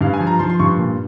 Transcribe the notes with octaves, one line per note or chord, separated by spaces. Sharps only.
G2 F5
G#5
F3
A#5
F3 C6
C6
G2 C#6
C6
A#2